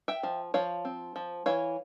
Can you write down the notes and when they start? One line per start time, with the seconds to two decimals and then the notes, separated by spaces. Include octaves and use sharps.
0.08 E5 G5
0.23 F3
0.54 F3 C#5 F5
0.85 C4
1.16 F3
1.46 E3 C#5 F5